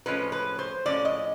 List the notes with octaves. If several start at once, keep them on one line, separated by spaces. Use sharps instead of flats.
A2 F3 G#3 C#4 B4
B4
C5
A2 F3 G#3 C#4 D5
D#5